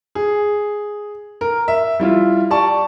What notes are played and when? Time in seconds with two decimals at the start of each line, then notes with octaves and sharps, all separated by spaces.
0.15 G#4
1.41 A#4
1.68 E5
2.00 G3 E4 F4
2.50 G4 D5 A5 C#6